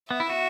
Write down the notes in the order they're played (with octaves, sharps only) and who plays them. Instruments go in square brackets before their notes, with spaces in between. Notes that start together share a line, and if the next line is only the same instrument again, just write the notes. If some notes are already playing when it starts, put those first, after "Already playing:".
[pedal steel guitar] B3 [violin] E5
[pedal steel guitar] E4
F#4